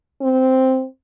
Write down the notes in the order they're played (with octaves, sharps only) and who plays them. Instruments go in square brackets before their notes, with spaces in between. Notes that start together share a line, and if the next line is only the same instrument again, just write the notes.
[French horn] C4